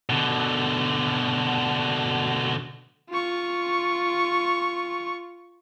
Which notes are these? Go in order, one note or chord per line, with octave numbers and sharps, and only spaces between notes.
B2 D3
F4 C#6